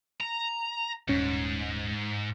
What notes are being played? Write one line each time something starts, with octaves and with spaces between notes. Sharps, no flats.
A#5
D#1 G#2 C#4